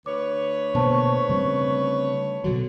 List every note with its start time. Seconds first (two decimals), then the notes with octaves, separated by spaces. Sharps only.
0.06 D2 B4 C#5 D6
0.75 B2 D3 A#3 C5 A5 C#6
1.29 C#3 G3 C4
2.44 B2 D3 F#3 F#4